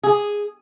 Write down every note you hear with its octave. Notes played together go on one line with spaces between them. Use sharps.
G#4